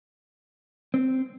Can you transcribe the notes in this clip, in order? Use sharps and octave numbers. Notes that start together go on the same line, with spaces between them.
C4